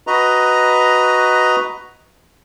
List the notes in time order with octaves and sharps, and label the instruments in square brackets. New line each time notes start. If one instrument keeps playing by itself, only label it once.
[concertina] F#4 B4 D#5 A#5